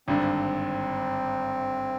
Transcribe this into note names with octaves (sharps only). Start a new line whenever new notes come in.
G#1 G2 D3 C4